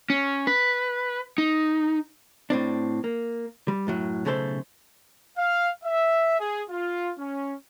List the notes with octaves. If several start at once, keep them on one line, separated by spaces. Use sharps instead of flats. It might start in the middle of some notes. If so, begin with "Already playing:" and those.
C#4
B4
D#4
A2 C4 D4
A#3
G3
F#2 A2 F#3
B1 C#3 A3 A4 C5
F5
E5
G#4
F4
C#4